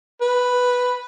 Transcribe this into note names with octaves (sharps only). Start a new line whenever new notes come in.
B4